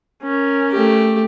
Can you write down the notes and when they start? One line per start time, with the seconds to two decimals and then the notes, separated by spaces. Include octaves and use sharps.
0.22 C#4 A#4
0.71 A3 G4